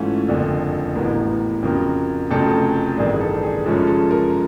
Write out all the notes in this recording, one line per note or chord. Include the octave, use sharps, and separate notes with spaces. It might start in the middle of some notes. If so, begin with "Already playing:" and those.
Already playing: G#2 E3 A3 C#4 F4
F#1 F2 D3
A1 A2 F#3 B3 A#4
F2 C#3 F#3 A#3
F1 F2 C#3 F#3 A3 A4
A1 G2 D#3 G3 G#4
A4
G#4
F#2 C#3 F3 G#3 C#4 A4
A4
A#4